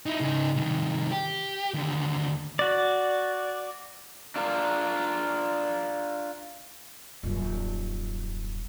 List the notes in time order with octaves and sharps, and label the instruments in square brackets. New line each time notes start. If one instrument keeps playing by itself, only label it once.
[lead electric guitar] D#4 E4
C#3 D#4
C2 D#3
G4
D#2 D3
[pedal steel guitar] F#4 D5
[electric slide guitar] D4 F4 A#4
[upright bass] D#1 F#2